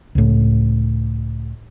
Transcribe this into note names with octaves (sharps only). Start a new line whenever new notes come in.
C#2 A2